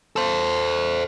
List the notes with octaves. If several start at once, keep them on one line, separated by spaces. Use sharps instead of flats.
A4 C5